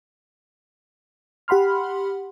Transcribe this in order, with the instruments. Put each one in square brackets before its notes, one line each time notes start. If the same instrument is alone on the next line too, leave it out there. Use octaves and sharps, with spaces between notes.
[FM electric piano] G4 F#5 B5 C6 F6